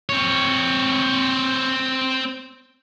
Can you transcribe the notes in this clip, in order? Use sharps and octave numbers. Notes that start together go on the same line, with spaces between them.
C4 C#5